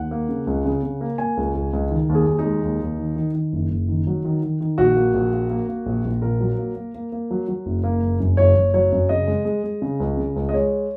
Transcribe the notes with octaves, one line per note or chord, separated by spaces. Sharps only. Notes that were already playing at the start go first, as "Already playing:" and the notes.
Already playing: D#2 F#5
A#3
C#3
C#2
C#3
C#3
A#3
A#3 G#5
C#2
C#2
C#2
D#3
D#2
G#4
D#2
D#4
G#3
D#2
D#2
D#3
D#3
D#3
F#1
F#1
D#3
F#3
D#3
D#3
D#3
A#1 F#4
A#3
A#1
A#3
A#3
A#3
A#1
A#1
A#2 A#4
F#3
A#3
A#3
A#3
A#3
F#3
F#3
F#1
A#3
F#1
F#2
F#1 C#5
F#1
F#3 C#5
F#2
C#3 D#5
G#3
G#3
G#3
C#3
C#2
C#3
C#2
D#5
G#3 C#5